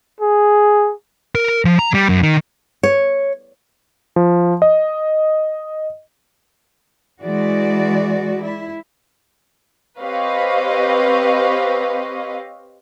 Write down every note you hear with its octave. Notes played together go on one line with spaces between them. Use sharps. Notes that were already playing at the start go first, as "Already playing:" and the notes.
G#4
A#4
F3
A#5
G3
F#2
D#3
C#5
F3
D#5
E3 G#3 F#4 D5
E4
C4 G4 B4 C#5 D#5 F5